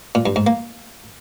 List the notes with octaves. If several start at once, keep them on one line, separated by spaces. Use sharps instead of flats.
A#2
G2
G#2
A#3